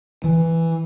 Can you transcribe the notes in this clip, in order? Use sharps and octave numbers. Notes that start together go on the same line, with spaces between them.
E3